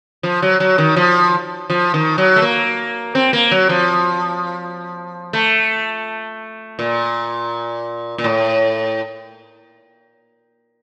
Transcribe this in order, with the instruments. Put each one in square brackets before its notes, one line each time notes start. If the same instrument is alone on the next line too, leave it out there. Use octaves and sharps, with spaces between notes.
[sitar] F3
F#3
F#3
D#3
F3
F3
D#3
F#3
A3
A#3
C4
A#3
F#3
F3
A3
A#2
A#2
A2